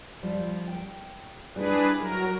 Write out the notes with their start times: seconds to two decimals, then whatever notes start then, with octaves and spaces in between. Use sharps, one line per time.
0.23 F3 G3
0.68 G5
1.56 G3 D4 E4 G#4 B4
1.99 F#3 A#4